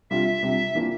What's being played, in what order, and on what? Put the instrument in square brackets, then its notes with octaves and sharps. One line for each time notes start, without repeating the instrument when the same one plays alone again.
[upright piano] C3 G3 D4 F4 [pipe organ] E5
[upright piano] C3 G3 D4 F4
E3 A#3 D4 F4